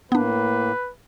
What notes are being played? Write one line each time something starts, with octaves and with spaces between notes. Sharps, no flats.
A2 A#3 B3 D4 B4